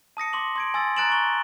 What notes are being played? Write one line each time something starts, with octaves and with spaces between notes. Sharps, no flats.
A5 D#6 A#6 C#7
C6 D6 F#7
C6 G#6 D7
G#5 C6 E6 A6
A#5 F#6 A6 D7 E7 F#7
A#5 C#6 F#6 D7 F#7 G7